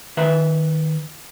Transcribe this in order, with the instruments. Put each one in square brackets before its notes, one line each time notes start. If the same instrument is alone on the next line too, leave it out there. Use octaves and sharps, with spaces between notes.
[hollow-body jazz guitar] D#3 B4 E5 A#5